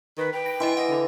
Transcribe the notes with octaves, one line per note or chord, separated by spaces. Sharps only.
D#3 B4
B4 G5
A#6 D7
E3 E4 D#5 C6
D#5 F#5
D3